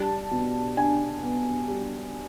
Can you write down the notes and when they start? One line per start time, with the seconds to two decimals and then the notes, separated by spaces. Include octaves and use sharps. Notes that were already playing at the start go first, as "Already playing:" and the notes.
Already playing: G3 A5
0.31 B2
0.77 D4 G#5
1.23 B3
1.68 G3